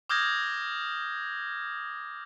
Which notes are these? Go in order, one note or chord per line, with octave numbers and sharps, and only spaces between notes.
D6 D#6 F6 G6 G#6 A#6